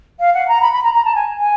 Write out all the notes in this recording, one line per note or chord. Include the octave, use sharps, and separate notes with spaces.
F5
F#5
A#5
B5
B5
A#5
A#5
A5
G#5
G#5